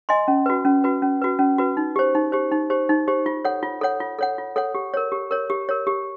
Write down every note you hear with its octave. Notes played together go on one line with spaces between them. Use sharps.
D#5 G#5 C6
C#4
F#4 B4
C#4
F#4 B4
C#4
F#4 B4
C#4
F#4 B4
D#4
G4 C5
D#4
G4 C5
D#4
G4 C5
D#4
G4 C5
F4
A4 C#5 F#5
F4
A4 C#5 F#5
F4
A4 C#5 F#5
F4
A4 C#5 F#5
G4
A#4 C#5
G4
A#4 C#5
G4
A#4 C#5
G4